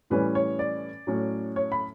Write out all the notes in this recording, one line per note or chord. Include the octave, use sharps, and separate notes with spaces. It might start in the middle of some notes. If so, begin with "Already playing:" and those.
A2 E3 G3 C#4 B4
C#5
D5
A2 F#3 C#4
C#5
B5